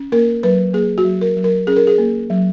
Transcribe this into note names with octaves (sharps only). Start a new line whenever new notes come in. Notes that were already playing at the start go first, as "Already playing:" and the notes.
Already playing: C#4
A#3 A#4
F#3 B4
A#3 G#4
F#4
F#3
A#4
F#3
A#4
C#4 G#4
A#4
G#4
A#3
F#3